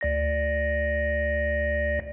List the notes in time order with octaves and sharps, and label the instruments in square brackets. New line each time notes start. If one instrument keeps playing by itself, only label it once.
[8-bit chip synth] D2 D5 A#6